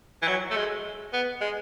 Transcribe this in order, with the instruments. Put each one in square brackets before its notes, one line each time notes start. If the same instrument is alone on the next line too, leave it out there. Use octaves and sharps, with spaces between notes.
[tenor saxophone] E3
F#3
A3
G#3
B3
G#3